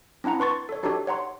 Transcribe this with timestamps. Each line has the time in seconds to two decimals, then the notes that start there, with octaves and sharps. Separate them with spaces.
0.24 C4 D4 E4 F#5 A#5
0.39 D4 B4 C6 C#6 A6
0.69 A4 C#5
0.83 D4 D#4 F#4 G4 A4 C#5
1.07 C#5 F#5 A#5 C6